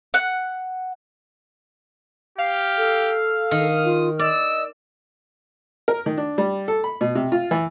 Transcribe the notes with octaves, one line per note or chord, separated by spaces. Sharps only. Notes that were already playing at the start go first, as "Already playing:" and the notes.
F#5
G4 F5
A4
D#3 D#6
F4
D5 D#5 E6
A#4
D#3
D4
G3
A4
B5
B2
C3
F4
E3